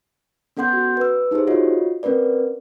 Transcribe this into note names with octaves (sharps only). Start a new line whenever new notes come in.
B3 C#4 A4 F#5 C6 G6
F#4
B4 E6
D#4 E4 G4 G#4 C5
F4 F#4 C#5 D#5
C4 C#4 A#4 B4 D5